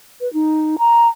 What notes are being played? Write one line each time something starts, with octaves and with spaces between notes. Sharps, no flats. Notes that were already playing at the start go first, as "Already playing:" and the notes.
B4
D#4
A#5